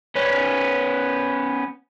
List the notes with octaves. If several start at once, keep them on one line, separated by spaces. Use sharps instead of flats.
B3 C#4